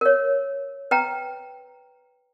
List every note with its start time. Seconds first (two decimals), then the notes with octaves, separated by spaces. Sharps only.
0.01 A#4 C#5
0.91 B4 G5 A#5